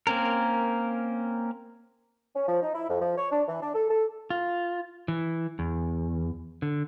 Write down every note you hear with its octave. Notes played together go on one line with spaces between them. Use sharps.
A#3 C4 C#4 A#4
C#4
F3
D#4
E4
F2
F3
C#5
D4
E3
D4
A4
A4
F4
E3
E2
D3